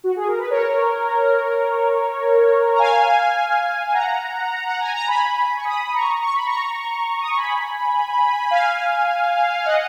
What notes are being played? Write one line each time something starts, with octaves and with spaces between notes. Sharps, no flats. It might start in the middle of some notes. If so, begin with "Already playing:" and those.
F#4
G#4
A#4
B4
A#4 C#5
A#5
F5 G#5
F#5 A#5
F#5
G#5
A#5
G#5 B5
C#6
B5 D#6
A#5 C#6
C#6
B5
A#5 C#6
D#6
C#6
G#5 B5
F5 G#5
D#5 F#5